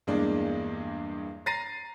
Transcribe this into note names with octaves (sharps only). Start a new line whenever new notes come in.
E2 G2 G#3 A#3 D4
A#5 A6 A#6 C7 D#7